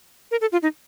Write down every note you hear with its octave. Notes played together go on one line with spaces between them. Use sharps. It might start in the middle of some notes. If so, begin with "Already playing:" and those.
A#4
A4
F4
D#4